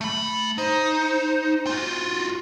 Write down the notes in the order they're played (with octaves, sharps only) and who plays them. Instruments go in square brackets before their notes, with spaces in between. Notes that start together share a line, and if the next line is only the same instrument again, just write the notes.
[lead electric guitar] A3 B5
[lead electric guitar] D#4 [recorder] C5
[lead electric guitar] F4 F#4